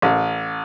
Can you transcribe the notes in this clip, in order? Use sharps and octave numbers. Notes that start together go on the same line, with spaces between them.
A1